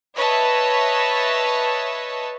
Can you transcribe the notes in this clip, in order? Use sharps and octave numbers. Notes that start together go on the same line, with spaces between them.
B4 C#5 D#5 E5 A5